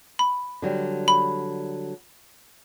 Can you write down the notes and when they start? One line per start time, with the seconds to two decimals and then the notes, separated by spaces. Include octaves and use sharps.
0.19 B5
0.62 D3 F#3 G3
1.08 B5